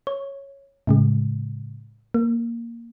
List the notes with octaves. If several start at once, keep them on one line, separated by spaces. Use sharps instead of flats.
C#5
A2 C#3 G#3
A#3